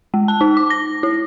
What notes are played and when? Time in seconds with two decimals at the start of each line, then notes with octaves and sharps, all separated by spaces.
0.14 G#3
0.28 A5
0.41 D#4
0.57 D6
0.70 A#6
1.03 E4